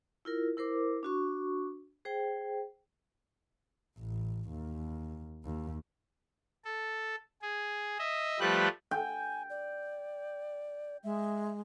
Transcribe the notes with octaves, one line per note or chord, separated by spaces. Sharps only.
E4 F4 A#4
E4 A#4 C5 D6
D4 F#4 C#6
G#4 C5 G5
A1
D#2
D#2
A4
G#4
D#5 E5
F3 G3 A3 G4 B4 F#6
G5 G#5
D5
G#3 E5